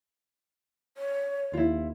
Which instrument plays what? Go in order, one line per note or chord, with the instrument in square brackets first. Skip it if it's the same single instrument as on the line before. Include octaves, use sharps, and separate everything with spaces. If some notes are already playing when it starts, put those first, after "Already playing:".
[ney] C#5
[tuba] D#2 [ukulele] E4 F4